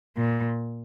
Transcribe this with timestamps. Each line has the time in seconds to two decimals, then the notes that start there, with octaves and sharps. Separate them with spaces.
0.17 A#2